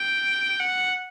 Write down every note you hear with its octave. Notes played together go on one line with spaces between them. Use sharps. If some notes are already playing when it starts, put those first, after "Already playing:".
Already playing: G5
F#5